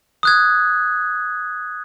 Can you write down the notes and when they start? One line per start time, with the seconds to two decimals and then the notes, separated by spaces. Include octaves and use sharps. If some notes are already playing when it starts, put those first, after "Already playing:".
0.23 D#6 F#6 G#6